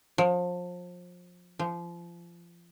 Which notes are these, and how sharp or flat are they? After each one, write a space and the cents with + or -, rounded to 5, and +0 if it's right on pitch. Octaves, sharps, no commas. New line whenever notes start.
F3 +30
F3 -25